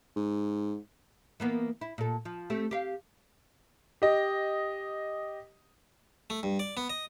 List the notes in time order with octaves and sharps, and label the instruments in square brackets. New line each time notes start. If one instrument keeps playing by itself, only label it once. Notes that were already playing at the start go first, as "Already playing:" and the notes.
[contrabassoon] G#2
[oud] E3 A#3 B3
E4
A#2 A4
F3
A3 C4 G4
G4 F5
[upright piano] G4 D#5
[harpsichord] A3
G2
D5
B3
D#5